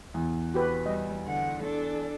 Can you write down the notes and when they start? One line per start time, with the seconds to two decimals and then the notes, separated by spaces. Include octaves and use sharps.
0.14 E2
0.54 F#4 G4 B4
0.86 G3 D#5
1.26 D3 F#5
1.63 D4 A4